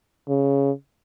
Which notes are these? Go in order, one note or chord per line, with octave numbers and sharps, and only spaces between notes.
C#3